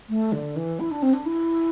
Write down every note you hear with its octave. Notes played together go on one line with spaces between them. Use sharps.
A3
D3
E3
E4
D4
C4
D4
E4